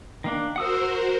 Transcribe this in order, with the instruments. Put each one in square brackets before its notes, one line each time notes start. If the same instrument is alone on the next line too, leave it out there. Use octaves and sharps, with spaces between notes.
[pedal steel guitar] D#3 A#3 D4
[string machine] F#4 A#4 C5 [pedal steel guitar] F#5 D#6 E6